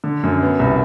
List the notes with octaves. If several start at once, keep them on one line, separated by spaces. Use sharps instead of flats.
D3
F#2
B3
C2